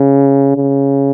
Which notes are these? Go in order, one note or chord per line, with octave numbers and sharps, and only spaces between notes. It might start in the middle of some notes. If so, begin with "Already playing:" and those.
Already playing: C#3
C#3